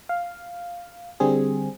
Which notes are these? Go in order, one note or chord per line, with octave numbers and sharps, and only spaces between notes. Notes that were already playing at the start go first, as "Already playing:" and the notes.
F5
D3 G3 C4 G#4